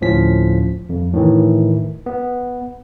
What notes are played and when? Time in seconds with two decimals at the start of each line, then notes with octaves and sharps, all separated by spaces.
0.01 D2 A2 F3 C#4 B6
0.89 F2
1.14 A2 D#3 E3
2.06 B3